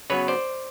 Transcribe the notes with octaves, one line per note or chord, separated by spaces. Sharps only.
C#3 F#3 B3 B4 C#5
C5 D5